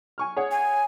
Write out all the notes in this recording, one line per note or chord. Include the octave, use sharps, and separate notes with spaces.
G#5 C#6 F6
G#4 C#5 F#5
G#5